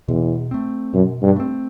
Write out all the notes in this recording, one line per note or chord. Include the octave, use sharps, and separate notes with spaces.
E2 B2
A3 C4
F#2 B2
G2
A3 C4